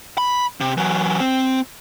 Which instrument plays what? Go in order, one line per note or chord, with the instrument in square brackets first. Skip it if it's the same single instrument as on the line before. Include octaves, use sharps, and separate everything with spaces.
[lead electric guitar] B5
C3
E3 F#3
C4